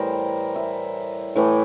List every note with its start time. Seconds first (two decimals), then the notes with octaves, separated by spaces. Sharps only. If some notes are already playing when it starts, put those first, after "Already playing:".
Already playing: A2 E3 G3 A#4 C5
0.56 E5
1.36 A2 E3 A3